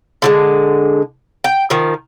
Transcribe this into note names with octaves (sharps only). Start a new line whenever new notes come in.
D3 F#3 G#3
G5
D#3 F3